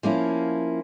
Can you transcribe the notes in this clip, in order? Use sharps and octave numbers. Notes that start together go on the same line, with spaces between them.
F3 A#3 C#4 E4